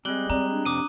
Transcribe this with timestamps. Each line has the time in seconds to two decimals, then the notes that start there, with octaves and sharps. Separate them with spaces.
0.05 G3 G#3 C4 F#6 F#7 G7
0.30 C4 D5 A#5
0.50 D4
0.65 F2 C3 D6 D#6 D#7